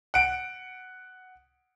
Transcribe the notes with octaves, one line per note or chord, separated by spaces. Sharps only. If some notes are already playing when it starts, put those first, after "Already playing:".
F#5 D7